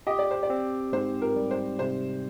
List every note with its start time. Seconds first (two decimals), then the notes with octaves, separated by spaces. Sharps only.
0.07 G4 D#5
0.19 D5
0.31 C5
0.43 D5
0.50 C4
0.93 G#2 C5
1.22 A#4
1.36 G3
1.51 C5
1.79 C3 C5